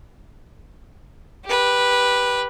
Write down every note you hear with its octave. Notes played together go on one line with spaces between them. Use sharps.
G4 B4